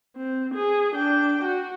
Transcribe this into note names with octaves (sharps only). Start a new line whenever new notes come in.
C4
G#4
D4 G5
F#4